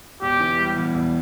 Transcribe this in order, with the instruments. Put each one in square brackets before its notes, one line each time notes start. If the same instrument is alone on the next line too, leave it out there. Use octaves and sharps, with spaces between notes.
[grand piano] E1 [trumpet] G4
[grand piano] E3
G3
E2
E1